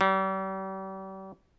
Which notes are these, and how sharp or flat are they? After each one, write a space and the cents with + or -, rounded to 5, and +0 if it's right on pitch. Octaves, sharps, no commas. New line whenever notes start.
G3 -40